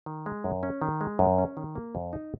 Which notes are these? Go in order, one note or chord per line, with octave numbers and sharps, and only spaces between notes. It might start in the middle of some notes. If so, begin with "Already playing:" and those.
D#3
G#3
F#2
C#4
D#3
G#3
F#2
C#4
D#3
A#3
F2
D#4